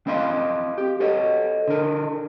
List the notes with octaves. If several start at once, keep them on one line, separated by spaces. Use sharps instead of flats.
C4 B4 D#5 F5 C6
G4
A4 C#5 D#5
D3 A#4